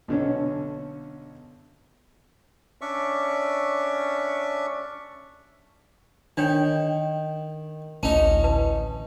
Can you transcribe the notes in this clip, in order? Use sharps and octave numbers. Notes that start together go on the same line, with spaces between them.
B1 D3 C#4
C#4 D4 D5 E5 C#6
D#3 D4 C#5 G5
A1 D2 E3 C#4 D#4 A5
B4 A5